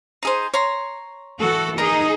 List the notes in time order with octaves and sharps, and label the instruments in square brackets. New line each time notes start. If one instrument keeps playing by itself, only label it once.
[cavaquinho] D#4 G#4 C5
C#5 A#5 C6
[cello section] E3 F#4 A4
[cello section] D#4 G#4 [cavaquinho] A#4 A#5